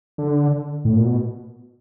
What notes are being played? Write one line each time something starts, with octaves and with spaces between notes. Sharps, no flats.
D3
A2
A#2
B2